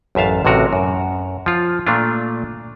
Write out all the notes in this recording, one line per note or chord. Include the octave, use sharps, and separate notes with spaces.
A1 F#2 E5 F5 A5
A1 A2 C3 F#4 A#4
F#2
F3 F4
A#2 A3 D4 F4